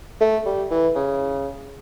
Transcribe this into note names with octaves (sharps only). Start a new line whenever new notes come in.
A3
G3
E3
C#3